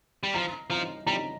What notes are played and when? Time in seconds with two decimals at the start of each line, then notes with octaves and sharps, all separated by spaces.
0.23 G3
0.34 F3 A#5
0.70 F3 A#5
1.06 G3 A#5